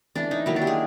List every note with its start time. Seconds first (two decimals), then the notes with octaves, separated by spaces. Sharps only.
0.16 E3 A3 D4
0.31 D#4
0.46 D#3 F#3 A#3 E4
0.56 D4
0.62 G4
0.67 G#4